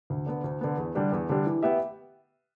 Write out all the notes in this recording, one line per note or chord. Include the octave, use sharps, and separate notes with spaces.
D2
D3 B3
D2
D3 B3
E2
D3 G3 D4 G4
E2
D3 G3 D4 G4
E3
B3 G4 E5